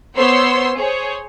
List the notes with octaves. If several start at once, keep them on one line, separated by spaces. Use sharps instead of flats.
B3 C5 C#5 C6 E6
G#4 C5 C#5